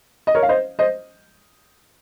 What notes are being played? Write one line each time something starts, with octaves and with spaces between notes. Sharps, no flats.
D#5
A#4 C#5
F5
C5 D#5
C5 D#5